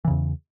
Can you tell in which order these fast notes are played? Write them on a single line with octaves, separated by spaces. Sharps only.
E3 C#3 E2